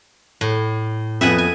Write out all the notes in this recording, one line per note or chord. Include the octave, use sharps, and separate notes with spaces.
A2
F2 B3 E5 F#5 G#5
G#5